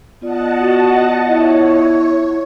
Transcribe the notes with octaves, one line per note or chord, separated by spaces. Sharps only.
B3 F4 D5 D#5 F#5 A5
F#4
E4 C#5